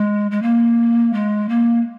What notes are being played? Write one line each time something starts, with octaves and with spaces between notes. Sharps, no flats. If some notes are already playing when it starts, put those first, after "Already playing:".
Already playing: G#3
G#3
A#3
G#3
A#3